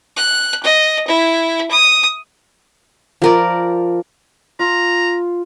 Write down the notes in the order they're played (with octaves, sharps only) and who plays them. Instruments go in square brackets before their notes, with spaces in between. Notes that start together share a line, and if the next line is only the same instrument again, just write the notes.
[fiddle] F#6
D#5
E4
D#6
[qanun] F3 A#4 D5
[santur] F4 [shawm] A#5